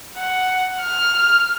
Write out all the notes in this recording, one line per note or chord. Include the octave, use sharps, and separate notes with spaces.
F#5
F6